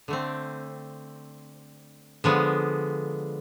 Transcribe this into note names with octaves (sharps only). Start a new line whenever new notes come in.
D3 A3 C4
D3 F3 G#3 B3